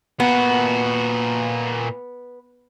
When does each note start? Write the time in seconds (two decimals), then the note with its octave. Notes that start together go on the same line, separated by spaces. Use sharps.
0.20 A#2 B3 F#4